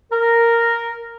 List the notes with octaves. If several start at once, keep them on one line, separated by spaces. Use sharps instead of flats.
A#4